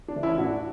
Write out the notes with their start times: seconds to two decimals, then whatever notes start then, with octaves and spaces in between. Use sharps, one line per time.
0.08 D4
0.16 E3
0.23 C#4 E4
0.38 A2 D4 F#4